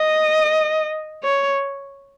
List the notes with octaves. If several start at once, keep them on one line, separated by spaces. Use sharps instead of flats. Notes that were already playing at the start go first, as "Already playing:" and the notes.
Already playing: D#5
C#5